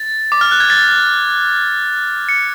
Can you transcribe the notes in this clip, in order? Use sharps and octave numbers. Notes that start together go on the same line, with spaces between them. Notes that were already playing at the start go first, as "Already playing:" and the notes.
Already playing: A6
D6
F6
F#6
G#6
A6
C#7